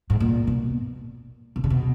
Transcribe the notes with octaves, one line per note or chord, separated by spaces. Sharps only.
G#2
A#2
B2
B2
C#3
B2